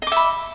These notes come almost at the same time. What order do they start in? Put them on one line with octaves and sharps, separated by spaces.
D#5 D6 E5 B5